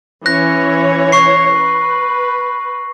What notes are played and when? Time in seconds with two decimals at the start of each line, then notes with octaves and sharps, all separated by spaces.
0.26 E3 C#4 C#5 F#6 A#6
1.12 C#6 C7
1.55 B4